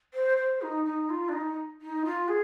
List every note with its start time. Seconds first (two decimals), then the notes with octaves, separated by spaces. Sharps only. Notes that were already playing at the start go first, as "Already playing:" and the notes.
0.14 C5
0.37 C5
0.62 D#4
0.85 D#4
1.09 F4
1.29 D4
1.33 D#4
1.81 D#4
2.05 F4
2.28 G#4